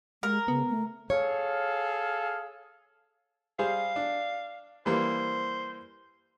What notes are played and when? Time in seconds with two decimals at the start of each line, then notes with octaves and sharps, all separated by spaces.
0.23 G#3 A#4
0.48 C#3 B3
0.70 A3
1.10 G#4 A4 C#5 F5
3.59 G3 G#4 C5 F5
3.96 D4
4.86 E3 G3 A#3 C5